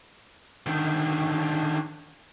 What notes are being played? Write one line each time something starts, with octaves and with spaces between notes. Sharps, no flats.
D3 D#3